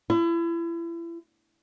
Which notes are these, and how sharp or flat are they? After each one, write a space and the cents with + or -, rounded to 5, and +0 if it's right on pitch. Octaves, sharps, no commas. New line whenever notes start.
E4 +35